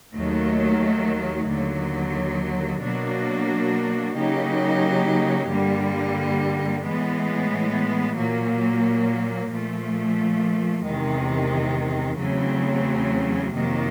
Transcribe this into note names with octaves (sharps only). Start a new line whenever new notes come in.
D#2 D#3 F#3 A3
D#2 D3 F#3
B2 F#3 A#3 D4 F#4
C#3 F#3 A#3 D#4 G4
G2 D3 G3 A#3
A2 E3 G#3 B3
A#2 F#3 A#3
A#2 F3 A3
E2 C3 D#3 G#3
E2 C#3 F#3 A3 C4
F2 C3 D#3 F#3 A#3